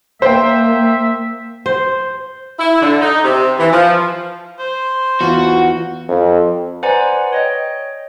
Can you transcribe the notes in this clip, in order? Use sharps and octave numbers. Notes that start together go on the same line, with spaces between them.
A#3 C5 E5 G5
C5
E4
D3
D#4
C3
E3
F3
C5
E2 F4 F#4
F2
B4 C5 D5 F#5 G#5 A#5
C#5 D#5 G5